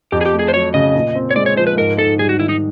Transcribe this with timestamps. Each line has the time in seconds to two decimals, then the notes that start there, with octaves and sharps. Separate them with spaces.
0.12 F2 G4
0.21 G#4
0.26 G4
0.33 A3
0.39 G#4
0.48 C5
0.53 F#3 C#5
0.74 C#3 D#5
0.95 A#2
1.15 C4
1.31 C#5
1.36 G#3 D5
1.46 C#5
1.57 F3 C5
1.67 B4
1.77 G#2 A#4
1.98 G#2 A4
2.19 G3 G#4
2.29 F#4
2.39 D#3 E4
2.49 D#4